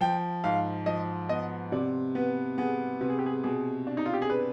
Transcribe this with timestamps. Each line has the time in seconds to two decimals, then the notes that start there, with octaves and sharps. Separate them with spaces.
0.01 F3 G5
0.44 G#2 F5
0.86 F3 D#5
1.29 B3 D#5
1.72 C3 D5
2.15 B3 B4
2.58 B3 G#4
3.01 C3 B4
3.09 G#4
3.19 G4
3.26 G#4
3.43 B2 G#4
3.87 D4
3.97 D#4
4.06 F4
4.14 G4
4.22 G#4
4.29 D4 B4